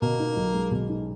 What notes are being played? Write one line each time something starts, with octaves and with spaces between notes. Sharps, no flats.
B2 A#3
D#4
B1
G#3
B2
D#4